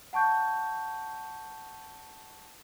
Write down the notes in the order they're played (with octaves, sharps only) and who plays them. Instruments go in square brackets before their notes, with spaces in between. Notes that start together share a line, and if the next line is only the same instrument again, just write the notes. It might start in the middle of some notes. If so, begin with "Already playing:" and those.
[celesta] F#5 A5 C#6 G6